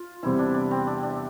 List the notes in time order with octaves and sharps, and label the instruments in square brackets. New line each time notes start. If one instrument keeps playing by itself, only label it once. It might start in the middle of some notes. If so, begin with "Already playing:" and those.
Already playing: [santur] F4
[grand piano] E2 C3 G3 C4 [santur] E4
[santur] D4
D4
C4
D4
D4